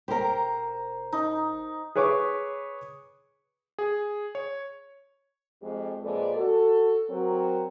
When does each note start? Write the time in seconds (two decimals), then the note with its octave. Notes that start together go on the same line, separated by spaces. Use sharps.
0.08 E1 G4 A#4 C5 A#5
1.12 D#4
1.96 G#4 B4 C#5 C#6 D6
3.79 G#4
4.35 C#5
5.62 F2 G#3 G4
6.02 F2 A#2 G#3 A4 B4 D5
6.37 F#4 A4
7.10 F#3 C4 A#4